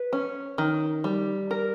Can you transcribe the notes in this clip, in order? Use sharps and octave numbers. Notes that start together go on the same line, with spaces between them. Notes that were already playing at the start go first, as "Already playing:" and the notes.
Already playing: B4
C#4
D#3
G3
A#4